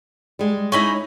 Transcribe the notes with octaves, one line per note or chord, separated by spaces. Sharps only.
G3 G#3
G#3 C#4 D#4 E4 B5